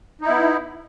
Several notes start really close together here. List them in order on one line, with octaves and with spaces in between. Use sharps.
D#4 E4 B3